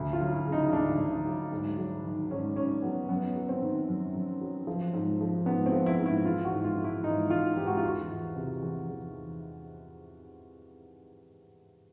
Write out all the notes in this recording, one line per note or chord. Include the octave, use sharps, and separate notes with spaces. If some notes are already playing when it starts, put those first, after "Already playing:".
Already playing: D2
F4
F#3
E4
C#3
D#4
D2 D4
D2
F#3
G#2
F#3
D#3
G#2 C#4
G#2 C#4
F#3 B3
F#2 B3
F#3
C4
D#3
F#2
F#2
F#3
F3
G#2
F3
G#2 B3
C4
F3
E4
G#2
E4
E3 F4
F#4
G#2
F4
E3
E4
G#2 D#4
E3 F4
G#2 G4
F#4
F4
E2 F#4
E3
C3
E2
E2